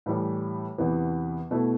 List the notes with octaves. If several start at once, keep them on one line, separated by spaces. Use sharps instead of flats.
A2 E3 G3
E2 C3 E3 B3
B2 A3 E4